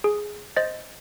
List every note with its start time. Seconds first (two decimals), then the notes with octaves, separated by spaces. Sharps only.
0.04 G#4
0.57 C5 D#5 A6